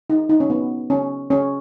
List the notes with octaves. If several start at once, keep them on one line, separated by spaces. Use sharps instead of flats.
D#4
D#4
C#4
B3
C#4
C#4